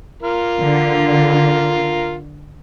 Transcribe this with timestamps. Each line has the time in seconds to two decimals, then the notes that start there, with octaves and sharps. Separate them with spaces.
0.22 F4 A#4
0.60 D3